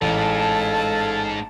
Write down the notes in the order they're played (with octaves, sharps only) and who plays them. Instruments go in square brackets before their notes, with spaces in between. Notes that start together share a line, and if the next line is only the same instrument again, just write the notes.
[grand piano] A1 [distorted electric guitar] G#2 [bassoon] A4 [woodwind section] F5 A5